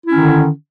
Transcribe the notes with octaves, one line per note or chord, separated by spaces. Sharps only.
D3 D#3 C#4 E4